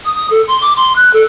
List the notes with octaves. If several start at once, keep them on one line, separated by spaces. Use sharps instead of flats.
D#6
A4
C6
D6
C6
F#6
A4